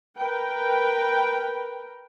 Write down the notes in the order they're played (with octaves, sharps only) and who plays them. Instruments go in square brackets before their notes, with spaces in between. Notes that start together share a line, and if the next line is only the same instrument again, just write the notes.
[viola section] A#4 B4 G5